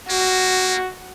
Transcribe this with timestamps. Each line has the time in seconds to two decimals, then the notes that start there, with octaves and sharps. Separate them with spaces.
0.10 A#3 F#4